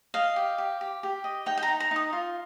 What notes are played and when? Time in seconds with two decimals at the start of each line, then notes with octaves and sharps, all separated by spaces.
0.14 D#5 F5
0.36 G4
0.58 G4
0.81 G4
1.03 G4
1.24 D#5
1.46 D#4 G5
1.58 G5
1.63 A#5
1.68 D#4
1.80 A#5
1.91 D#4 D#6
2.13 F4